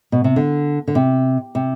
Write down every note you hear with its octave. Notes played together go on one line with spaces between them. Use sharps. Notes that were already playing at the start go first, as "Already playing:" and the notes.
B2
C3
D3
D3
C3
C3